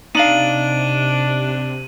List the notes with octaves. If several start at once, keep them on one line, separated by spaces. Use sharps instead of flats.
C3 D4 D#4 F5 D#7 F#7